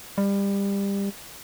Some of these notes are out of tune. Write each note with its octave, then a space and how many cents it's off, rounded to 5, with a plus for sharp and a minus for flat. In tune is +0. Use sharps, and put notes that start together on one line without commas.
G3 +25